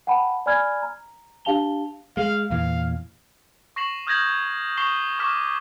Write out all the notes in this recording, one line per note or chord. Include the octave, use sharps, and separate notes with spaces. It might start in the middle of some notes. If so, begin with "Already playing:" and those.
F#5 G5 A5 B5
D5 G#5 B5 F6 G#6
A#5
D4 G4 F5 A5 F7 G7
G#3 F5
E2 A#2 E3 F5
C#6 A#6 C7 E7 F#7
D#6 F6 G6 G#6 A#6 F#7
C#6 D#6 C7 E7 G7
C#6 D6 F6 B6 E7